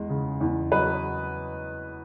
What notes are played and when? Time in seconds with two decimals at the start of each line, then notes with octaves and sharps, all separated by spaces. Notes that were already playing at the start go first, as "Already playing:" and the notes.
Already playing: E2 G#3
0.10 C#3
0.41 E2
0.72 F#3 B4 D#5